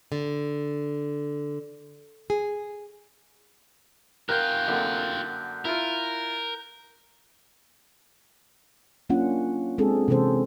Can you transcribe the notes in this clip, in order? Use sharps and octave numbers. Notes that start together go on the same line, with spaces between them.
D3
G#4
F4 G4 A#4 F#6 G6
F#2 D3 A#3
E4 F4 A#4
F#3 A#3 C#4 D4 F4 F#5
G#3 C4 D4 G#4 A4
C3 E3 G#3 C#4 A4 C5